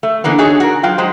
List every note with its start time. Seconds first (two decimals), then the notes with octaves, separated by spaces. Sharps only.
0.03 A3
0.24 D3 E3 A#3 B3
0.38 D#4 F#4 G#4 A4 C#5
0.60 F#4 A#4
0.83 F#3 F4 G5
0.98 F#3 G#3 C5